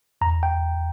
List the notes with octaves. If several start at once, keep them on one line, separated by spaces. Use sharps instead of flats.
E2 A#5
G5